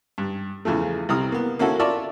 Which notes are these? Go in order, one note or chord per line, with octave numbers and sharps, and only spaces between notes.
G2
E2 C#3 F3 A3
C2 C3 A#5 D#6 F6
A#3 B3
A#3 C#4 E4 F#4 A4
F4 A#4 D5 E5 A5 C#6